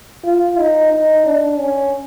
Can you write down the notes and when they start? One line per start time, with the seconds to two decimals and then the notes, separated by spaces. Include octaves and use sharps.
0.24 F4
0.58 D#4
0.91 D#4
1.26 D4
1.59 C#4